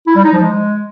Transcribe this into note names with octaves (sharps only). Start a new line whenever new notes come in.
E4
G3
D#4
F3
G#3